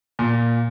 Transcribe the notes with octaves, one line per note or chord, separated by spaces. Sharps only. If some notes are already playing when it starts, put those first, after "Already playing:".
A#2